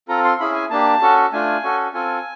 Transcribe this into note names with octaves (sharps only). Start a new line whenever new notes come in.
C4 F4 A4 A#5
C6
C#4 E4 G#4 B5
G#5
A#3 D4 G4 A5
C#4 F#4 A4
A3 D4 F4 G#5
C#4 F#4 A4
C4 F4 A4 G#5